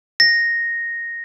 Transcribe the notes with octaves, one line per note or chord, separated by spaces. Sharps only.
A#6